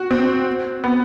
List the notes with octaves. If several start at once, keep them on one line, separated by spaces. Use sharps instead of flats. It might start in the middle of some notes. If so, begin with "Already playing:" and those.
Already playing: F#4
C4
B3